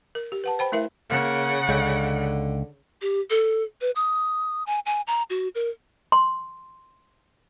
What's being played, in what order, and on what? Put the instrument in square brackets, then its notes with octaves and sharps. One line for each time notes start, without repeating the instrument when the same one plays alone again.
[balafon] A#4
G4
B4 F#5 A5
C5 G5 B5
A3 E4 A#4 E5
[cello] C#3 F#5 [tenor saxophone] A#3
[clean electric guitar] C#2 [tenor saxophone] D3
[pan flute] G4
A4
B4
D#6
G#5
G#5
A#5
F#4
A#4
[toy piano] C6